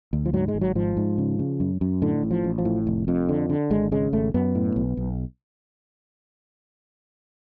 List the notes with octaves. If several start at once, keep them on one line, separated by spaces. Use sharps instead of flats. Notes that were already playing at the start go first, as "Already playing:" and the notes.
D2
F3
G#2 F#3
G#3
G#1
F#3
G#2 F3
G#2
C#3
C#3
F#2
F#2
A2 D3
A1
F3
A1
F3
A2
F1
F2
D3
D3
G#1 G#3
C#3 G#3
G#1 A3
F#2 B3
A2
B1
B1